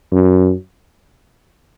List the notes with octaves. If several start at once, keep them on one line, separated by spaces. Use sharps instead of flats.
F#2